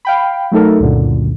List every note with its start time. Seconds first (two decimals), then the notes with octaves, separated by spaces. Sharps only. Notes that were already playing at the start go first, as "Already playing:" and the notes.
0.05 F5 G5 B5
0.52 F#3 A3 D#4 A4 A#4
0.80 C#2 F#2 A#2 D3